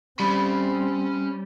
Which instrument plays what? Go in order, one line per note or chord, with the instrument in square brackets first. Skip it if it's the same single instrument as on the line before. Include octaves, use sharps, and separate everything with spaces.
[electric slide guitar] G3 [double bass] C4 [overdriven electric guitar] C#4 B5